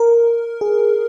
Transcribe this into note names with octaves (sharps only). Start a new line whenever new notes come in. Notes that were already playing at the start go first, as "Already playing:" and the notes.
Already playing: A#4
G#4